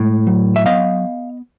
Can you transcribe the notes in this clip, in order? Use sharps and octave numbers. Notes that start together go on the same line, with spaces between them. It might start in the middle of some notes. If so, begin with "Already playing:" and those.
Already playing: A2 G#3
F#3
E5
B3 D#5 F5